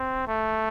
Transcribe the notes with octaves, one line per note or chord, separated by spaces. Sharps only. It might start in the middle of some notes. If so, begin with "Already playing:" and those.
Already playing: C4
A3